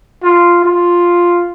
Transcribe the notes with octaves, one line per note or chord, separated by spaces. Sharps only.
F4
F4